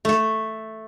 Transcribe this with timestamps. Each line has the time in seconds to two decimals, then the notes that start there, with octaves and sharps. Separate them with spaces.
0.05 A3 A4